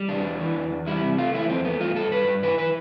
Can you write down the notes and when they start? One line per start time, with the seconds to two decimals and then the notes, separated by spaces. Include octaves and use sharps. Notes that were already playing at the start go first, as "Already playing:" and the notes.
Already playing: G3
0.09 E2 D4
0.24 E3
0.41 E3
0.55 E2
0.71 E2
0.87 G3 E4
1.02 C3
1.18 A3 F4
1.34 F3 E4
1.49 E2 C4
1.65 A3 B3
1.80 G2 F4
1.96 G2 A4
2.12 G2 B4
2.27 G2
2.43 E3 B4
2.58 E3 B4